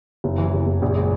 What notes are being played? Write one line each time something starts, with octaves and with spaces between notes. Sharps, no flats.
F#1
E3
F#1
F#1
A#1
G#3